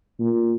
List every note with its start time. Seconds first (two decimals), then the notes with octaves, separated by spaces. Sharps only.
0.20 A#2